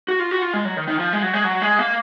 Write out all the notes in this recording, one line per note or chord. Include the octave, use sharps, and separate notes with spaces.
F#4
F4
F#4
F4
G#3
F#3
D#3
D#3
F3
G#3
F#3
G#3
F#3
G#3
A#3